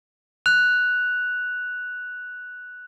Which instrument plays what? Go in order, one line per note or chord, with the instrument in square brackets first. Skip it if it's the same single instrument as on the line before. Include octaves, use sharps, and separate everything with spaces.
[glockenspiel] F#6 F7